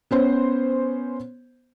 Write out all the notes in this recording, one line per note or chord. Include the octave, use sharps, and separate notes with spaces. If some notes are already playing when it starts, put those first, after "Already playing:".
B3 C#4 C5